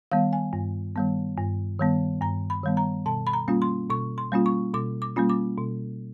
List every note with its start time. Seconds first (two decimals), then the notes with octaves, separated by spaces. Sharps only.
0.12 D#3 G3 B3 F5
0.33 G#5
0.53 G2
0.96 D#3 G3 B3
1.37 G2
1.79 D#3 G3 B3
2.21 G2 A#5
2.50 B5
2.64 D#3 G3 B3
2.77 A#5
3.06 B2 A5
3.27 B5
3.33 A#5
3.48 G3 A#3 C#4 F4
3.62 C6
3.90 B2 C#6
4.18 C6
4.32 G3 A#3 C#4 F4
4.46 C#6
4.74 B2 D6
5.02 D6
5.16 G3 A#3 C#4 F4
5.29 D6
5.58 B2